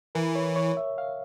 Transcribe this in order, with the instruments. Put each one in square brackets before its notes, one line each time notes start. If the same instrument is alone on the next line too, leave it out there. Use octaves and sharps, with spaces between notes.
[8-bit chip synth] E3 [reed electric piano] A#4
[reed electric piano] C#5
C#5
E5
F5